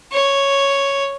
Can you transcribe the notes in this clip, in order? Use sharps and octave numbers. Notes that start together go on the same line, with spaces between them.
C#5